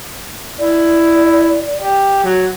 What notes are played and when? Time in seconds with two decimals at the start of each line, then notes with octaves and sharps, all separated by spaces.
0.59 E4 D5
1.78 G4
2.24 F#3